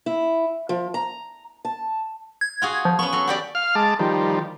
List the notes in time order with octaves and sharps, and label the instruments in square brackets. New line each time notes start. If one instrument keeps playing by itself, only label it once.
[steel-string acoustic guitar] E4
F3
A#5
A5
[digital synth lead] G#6
[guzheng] F4 F#4 G#4
[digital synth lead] F3
[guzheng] B3 C#4 [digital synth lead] C#6
[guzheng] F#3 A4
F#4 G4 D5
[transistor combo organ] F5 F6
G#3 A5 D6
D#3 F3 G3